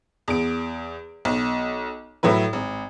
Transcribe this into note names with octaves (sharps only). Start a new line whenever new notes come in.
E2 D7
B1
A2 F#3 E4 B4
G#1